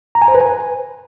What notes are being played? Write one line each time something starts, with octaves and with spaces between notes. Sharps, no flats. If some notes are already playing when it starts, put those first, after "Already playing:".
A#5
G#5
C5
B4
G#5